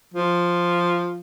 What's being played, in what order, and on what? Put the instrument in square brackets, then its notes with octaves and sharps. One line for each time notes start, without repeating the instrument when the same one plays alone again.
[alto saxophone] F3